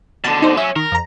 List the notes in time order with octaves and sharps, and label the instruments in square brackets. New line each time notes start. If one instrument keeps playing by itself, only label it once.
[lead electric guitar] B2 D3 [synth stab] A5
[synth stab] D#4 C5
[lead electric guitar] F#3 C#4 [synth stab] E5
[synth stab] D#3 [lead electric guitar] A#4
[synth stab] F2 A#5